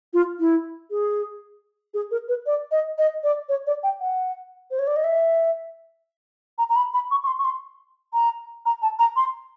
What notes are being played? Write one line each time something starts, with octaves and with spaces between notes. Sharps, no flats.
F4
E4
G#4
G#4
A#4
B4
D5
D#5
D#5
D5
C#5
D5
G5
F#5
C5
C#5
D5
D#5
E5
A#5
A#5
B5
B5
C#6
C#6
C6
C#6
C6
A#5
A#5
A5
A#5
C6